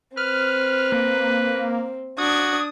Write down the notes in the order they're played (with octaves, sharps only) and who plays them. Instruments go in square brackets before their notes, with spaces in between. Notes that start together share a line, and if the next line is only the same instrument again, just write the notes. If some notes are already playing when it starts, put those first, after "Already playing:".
[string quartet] C4 [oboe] B4 [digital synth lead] F6
[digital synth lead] A#3
[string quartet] D4 G#6 [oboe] F#4 [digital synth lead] D#6